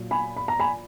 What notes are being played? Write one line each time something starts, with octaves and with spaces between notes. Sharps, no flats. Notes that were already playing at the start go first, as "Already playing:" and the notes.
Already playing: A#2 F#3
G#5 B5
B5
A#5
G#5 B5